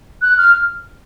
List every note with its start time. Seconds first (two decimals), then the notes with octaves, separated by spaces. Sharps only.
0.22 F#6
0.38 F6